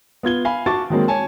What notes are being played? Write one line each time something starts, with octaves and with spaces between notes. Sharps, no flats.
B3 F4 G#6 G7
F5 G#5 B5
F#4 A5 C#6 D6 A6
D#3 F#3 G#3 A#3 C4
C#5 G#5 A5